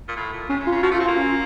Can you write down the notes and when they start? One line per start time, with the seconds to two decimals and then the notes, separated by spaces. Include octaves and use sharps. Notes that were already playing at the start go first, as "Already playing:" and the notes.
0.08 A#2
0.16 A2
0.33 A#2
0.49 C3 C#4
0.60 C#3
0.67 F4
0.72 C#3
0.83 F3 F#4
0.91 A3 F4
1.00 C4
1.05 A#3 F4
1.16 C#4